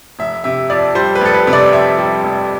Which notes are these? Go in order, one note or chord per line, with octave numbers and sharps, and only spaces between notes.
F1 E5
C3 E5
F2 D5
G3 C5
B4
F1 A4
B4
C3
D5
F2 E5
G3
F1